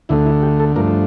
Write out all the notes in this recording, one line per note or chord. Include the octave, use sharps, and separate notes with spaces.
D2 D3 A3 E4
E4
G4
A4
G2 F3 A3 D4 A#4